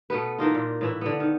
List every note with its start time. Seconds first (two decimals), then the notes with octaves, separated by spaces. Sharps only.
0.10 B2 A3 B3 B4
0.38 E3 A#3 D#4 F4
0.54 A#2
0.81 A2 E3 E4
1.01 D3 B3
1.20 D#3